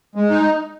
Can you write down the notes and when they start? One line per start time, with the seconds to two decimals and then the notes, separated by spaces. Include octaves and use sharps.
0.15 G#3
0.30 D#4